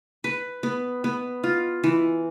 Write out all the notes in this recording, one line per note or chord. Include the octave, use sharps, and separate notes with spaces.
B4
B3
B3
F4
E3